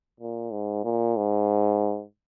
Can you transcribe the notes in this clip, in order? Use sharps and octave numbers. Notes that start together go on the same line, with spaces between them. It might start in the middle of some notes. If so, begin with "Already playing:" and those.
A#2
G#2
A#2
G#2